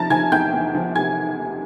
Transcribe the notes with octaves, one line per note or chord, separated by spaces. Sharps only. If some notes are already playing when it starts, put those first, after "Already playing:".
Already playing: C3 F3 A5 A#5 A6 A#6
F3 G#5 G#6
E2 G5 G6
E2
F3
C3 G#5 G#6